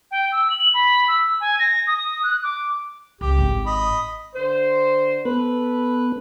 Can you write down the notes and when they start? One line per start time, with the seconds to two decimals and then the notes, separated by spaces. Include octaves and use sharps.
0.11 G5
0.32 E6
0.50 F#7
0.74 B5
1.08 E6
1.41 G#5
1.59 A#6
1.87 D#6
2.23 F#6
2.44 D6
3.21 C#2 G4
3.38 G#1 C4
3.66 D#5 B5
4.35 D3 C5
5.25 B3 A4 B4